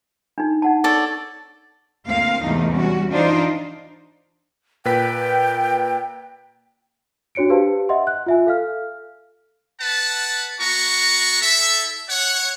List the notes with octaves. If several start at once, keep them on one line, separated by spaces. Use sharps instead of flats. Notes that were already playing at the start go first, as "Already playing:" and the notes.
D4 D#4
D#4 F#5 A5
A4 C#5 D5
D2 A#3 C4 F5
E2 G#2 C3 E3 A3 D#4
G3 C#4 F#4
E3 D4 D#4 F4 C5
A#2 B4 G5 B6
D4 F#4 C#5 C#7 D7
G4 B4 C5 F5 A5
D#5 E5 F#5 C6
F#6
F4 E5 G#5
A4 F5 F6
B4 F#5 A5
B3 F#4 A#5 C#6
E4 A4 E5
C#5 F#5